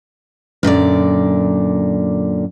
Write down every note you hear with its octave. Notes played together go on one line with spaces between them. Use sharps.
F#2 A#2 D3 D5